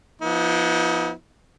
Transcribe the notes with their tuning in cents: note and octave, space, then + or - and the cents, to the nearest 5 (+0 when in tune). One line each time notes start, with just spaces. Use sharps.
F3 +0 B3 -15 D#4 +45